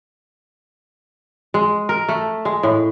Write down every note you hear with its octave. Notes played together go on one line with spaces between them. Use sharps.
G#3
A#4
A3
G#3
A2